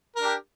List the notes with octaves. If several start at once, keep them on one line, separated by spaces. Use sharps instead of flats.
D4 G4 A#4